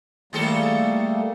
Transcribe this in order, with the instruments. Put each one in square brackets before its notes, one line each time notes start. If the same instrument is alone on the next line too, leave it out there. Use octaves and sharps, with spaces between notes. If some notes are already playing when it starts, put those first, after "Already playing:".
[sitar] D#3 G#4 A4 [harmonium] G3 A3 A#3